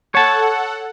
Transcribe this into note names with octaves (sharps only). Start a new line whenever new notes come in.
A4 C#5 F#5 A5